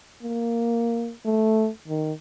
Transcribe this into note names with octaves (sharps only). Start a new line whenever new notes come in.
A#3
A3
D#3